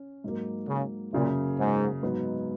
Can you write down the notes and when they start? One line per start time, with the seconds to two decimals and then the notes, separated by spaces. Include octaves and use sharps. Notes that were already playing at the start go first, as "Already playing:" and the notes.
Already playing: C#4
0.24 G#2 F#3 A#3
0.68 C#3
1.13 F#2 A#2 C#3 F#3 A#3
1.59 G#2
2.02 G#2 F#3 B3 D#4